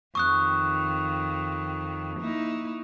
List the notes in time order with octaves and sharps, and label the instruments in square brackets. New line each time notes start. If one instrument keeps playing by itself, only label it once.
[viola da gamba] F2 D#3 [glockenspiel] C#6 D#6 F#6
[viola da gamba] A#3 D#4 E4